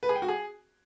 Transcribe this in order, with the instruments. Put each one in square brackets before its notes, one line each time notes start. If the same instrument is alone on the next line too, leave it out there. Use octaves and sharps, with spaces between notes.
[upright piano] B4
G#4
G5
F#4
G#4